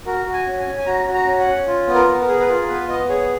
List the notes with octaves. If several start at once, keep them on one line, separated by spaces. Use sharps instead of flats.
F#4 A#4
F#4
G#5
C#4
G#5
C#4
G#5
F#4 A#5
F#4
A#5
C#4
F#5
C#4
F4
B3
A#4
B3
A#4
G#4
B4
F4 A#4
B3 B4
B3 D#5
G#4 C#5